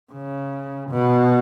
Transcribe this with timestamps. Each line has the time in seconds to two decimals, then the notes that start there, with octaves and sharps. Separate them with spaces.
0.13 C#3
0.90 B2